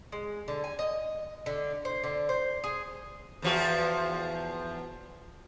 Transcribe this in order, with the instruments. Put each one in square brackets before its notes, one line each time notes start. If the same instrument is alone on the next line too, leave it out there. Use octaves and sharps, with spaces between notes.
[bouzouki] G#3
D3
G#5
D#5
D3
C5
D3
C5
G#4
[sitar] E2 F3 F#4